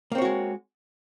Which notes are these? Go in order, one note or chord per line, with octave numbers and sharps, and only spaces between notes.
G#3 A#3 C4 F#4 C#5